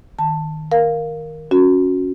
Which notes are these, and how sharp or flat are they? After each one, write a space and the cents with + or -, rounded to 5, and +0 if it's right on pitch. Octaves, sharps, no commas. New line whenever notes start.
D#3 +0 A5 +10
A#4 +0 F5 +0
C#4 +0 F#4 -15